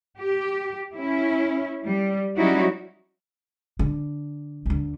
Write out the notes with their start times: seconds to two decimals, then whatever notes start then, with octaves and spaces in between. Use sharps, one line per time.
0.19 G4
0.95 C#4 E4
1.84 G3
2.36 F#3 G3 C#4 D#4 E4 F#4
3.79 D3
4.66 D2 D3